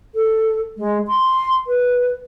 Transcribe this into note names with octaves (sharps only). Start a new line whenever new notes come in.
A4
G#3
C6
B4